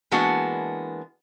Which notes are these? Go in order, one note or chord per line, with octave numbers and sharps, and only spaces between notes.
E3 G#3 A#3 B3 D4 F#4